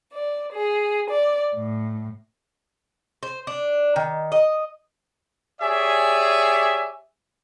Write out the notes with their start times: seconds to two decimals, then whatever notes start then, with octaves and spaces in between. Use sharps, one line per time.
0.13 D5
0.52 G#4
1.11 D5
1.55 A2
3.23 C5
3.47 D4
3.96 D#3
4.32 D#5
5.62 G4 G#4 C#5 D5 E5 G#5